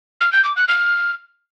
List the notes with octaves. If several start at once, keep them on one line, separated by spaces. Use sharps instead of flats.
F6
G6
D6
F#6
F6